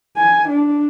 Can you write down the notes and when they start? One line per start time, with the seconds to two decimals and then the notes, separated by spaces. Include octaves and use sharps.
0.17 G#5
0.49 D4